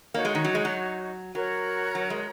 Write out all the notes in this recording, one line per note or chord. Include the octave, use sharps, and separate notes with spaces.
A#3 D#4 F#4 C#5
G#3
D#3
F#3
G#3
F#3
F#3 F#4 A#4 C#5 A#5
F#3
G#3